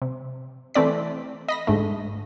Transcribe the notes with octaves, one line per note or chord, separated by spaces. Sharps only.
C3
E3 A3 C4 D5 B6
D#5 B5 A#6
G#2 D3 A3